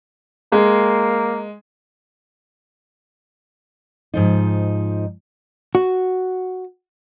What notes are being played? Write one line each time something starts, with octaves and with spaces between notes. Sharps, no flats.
G#3 A#3
G#2 F3 D#4
F#4